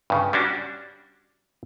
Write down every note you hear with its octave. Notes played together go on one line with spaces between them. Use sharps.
G2 C#3
G3 C#4 D4 F#4